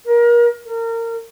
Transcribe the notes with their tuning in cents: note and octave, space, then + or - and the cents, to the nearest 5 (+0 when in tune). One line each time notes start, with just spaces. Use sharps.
A#4 +30
A#4 -25